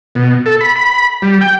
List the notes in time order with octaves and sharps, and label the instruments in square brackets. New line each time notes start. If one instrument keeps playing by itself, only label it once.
[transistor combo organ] B2
A4
B5
B5
G3
G5